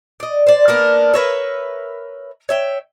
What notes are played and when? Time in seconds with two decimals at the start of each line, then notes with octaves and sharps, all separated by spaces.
0.20 D5 D#5
0.47 C5 D5
0.68 A#3 B3 D4 A#4
1.14 A#4 B4 C#5 E5
2.49 C#5 E5 G5